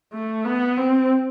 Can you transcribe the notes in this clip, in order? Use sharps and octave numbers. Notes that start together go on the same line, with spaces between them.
A3
B3
C4